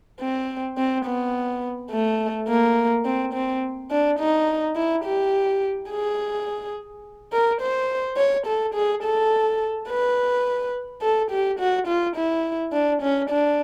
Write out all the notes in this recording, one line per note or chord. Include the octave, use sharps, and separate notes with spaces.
C4
C4
B3
A3
A#3
C4
C4
D4
D#4
E4
G4
G#4
A#4
C5
C#5
A4
G#4
A4
B4
A4
G4
F#4
F4
E4
D4
C#4
D4